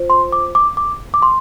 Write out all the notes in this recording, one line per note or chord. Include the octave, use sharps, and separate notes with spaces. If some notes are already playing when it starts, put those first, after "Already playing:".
Already playing: F4 C5
C6
D6
D6
D6
D6
C6